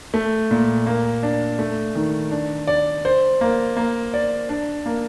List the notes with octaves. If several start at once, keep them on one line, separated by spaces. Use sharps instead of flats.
A3
A#2
A#3
D4
A3
D#3
D4
D5
C5
A#3
A#3
D5
D4
A#3